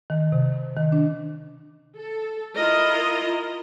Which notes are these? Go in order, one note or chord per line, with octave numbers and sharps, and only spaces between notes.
D#3
C3
D#3
D4
A4
E4 F4 A#4 D#5